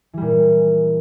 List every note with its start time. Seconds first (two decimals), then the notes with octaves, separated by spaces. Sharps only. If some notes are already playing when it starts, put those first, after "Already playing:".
0.13 E3
0.17 G3
0.21 A#2